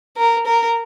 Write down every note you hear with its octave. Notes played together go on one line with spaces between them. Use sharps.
A#4
A#4